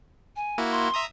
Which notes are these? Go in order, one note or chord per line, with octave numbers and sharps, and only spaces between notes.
G#5
A#3 E4 F#4
C6
E5 A#5 D#6